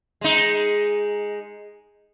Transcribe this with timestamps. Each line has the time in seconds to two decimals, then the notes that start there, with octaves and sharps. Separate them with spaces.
0.21 G#3 D#4